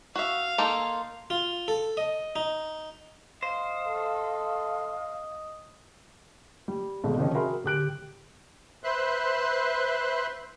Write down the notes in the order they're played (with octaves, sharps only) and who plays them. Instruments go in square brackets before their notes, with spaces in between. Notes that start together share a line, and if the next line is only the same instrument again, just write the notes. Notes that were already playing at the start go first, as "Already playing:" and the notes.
[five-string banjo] F#4 E5 [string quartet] F5
[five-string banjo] A#3 D#4 A4 [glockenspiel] C6
[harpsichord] F4
A4
D#5
D#4
[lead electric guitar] C5 [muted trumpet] D#5 [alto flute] F5
[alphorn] A4
[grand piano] G3
G#1 G#2 B2 G#3 A4
C3 D#3 F3 C#4 D#4
F#4 G#4 A#4 E5 B5 C6
D1 G4 F#6 D7
[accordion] B4 C5 E5 C6 F#6